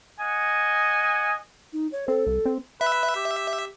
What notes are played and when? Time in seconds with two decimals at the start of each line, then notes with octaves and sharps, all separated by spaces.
0.20 D#5 F#5 G#5
1.73 D#4
1.92 C#5
2.08 C4 A4
2.27 C2
2.46 C4
2.81 B4 E5
3.16 G4